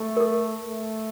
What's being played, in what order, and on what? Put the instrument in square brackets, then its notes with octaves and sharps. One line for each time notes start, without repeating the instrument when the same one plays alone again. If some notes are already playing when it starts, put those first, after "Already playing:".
Already playing: [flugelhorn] A3
[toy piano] A#4
A4
[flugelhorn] A3